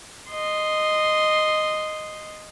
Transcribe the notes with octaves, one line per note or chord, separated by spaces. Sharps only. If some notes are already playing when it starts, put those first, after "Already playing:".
D#5 C6